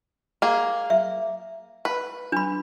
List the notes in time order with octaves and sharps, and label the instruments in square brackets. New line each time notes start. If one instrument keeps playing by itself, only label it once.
[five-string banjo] A#3 G#4
[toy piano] E5
[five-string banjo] B4
[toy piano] D4 B5